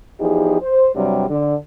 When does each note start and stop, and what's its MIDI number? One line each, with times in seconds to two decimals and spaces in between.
0.19 0.56 40
0.19 0.56 53
0.19 0.56 63
0.19 0.56 67
0.19 0.56 68
0.60 0.89 72
0.94 1.24 43
0.94 1.24 48
0.94 1.24 54
0.94 1.24 55
1.28 1.54 50